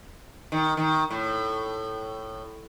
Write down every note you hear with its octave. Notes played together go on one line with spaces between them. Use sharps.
D#3
D#3
A2